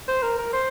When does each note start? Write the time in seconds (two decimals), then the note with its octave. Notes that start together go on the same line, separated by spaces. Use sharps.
0.08 C5
0.22 A#4
0.38 A#4
0.53 C5